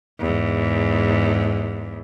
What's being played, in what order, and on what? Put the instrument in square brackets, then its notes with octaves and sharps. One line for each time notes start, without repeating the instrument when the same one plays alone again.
[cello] E2 G#2